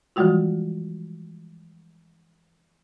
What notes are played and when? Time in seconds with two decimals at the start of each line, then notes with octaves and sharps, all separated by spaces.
0.16 E3 F3 G3 G#3 F4 F#4